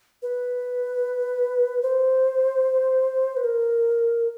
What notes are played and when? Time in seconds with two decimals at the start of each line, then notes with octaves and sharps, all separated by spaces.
0.22 B4
1.82 C5
3.37 B4
3.44 A#4